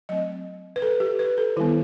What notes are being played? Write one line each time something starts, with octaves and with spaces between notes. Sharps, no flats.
F#3 A3 C4 D#5
B4
A4
G4
B4
A4
D#3 G3 B3 E4